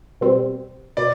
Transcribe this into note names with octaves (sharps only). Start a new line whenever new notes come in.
B2 G3 C4
B2 D5